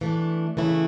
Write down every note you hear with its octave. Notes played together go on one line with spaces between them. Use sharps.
E3 A3 D4
C#3 E3 A3 E4